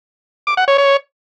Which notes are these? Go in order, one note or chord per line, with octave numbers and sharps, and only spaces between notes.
D6
F#5
C#5
C#5